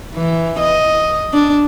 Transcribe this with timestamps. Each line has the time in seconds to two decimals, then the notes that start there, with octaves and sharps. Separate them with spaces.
0.15 E3
0.59 D#5
1.34 D4